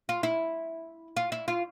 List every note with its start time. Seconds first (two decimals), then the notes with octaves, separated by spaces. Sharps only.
0.09 F4
0.23 E4
1.17 F4
1.32 E4
1.48 F4